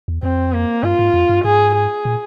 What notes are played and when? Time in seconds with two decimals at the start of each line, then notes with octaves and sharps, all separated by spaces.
0.08 E2
0.23 F2 C4
0.53 A#3
0.83 G2 F4
0.99 G#2
1.14 F2
1.29 G2
1.44 G#2 G#4
1.75 G#4
2.05 A#2